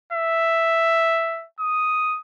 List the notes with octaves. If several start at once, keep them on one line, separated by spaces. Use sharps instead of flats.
E5
D#6